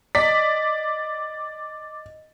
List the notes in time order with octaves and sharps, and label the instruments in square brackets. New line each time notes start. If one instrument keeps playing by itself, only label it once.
[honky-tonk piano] D5 B6 [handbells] D#5